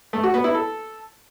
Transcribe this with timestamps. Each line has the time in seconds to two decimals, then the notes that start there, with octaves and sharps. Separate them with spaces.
0.13 A3
0.23 F#4
0.34 B3
0.44 E4
0.55 A4